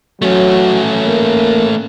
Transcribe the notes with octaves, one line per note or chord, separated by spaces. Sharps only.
F#3 A3 C#4
A#3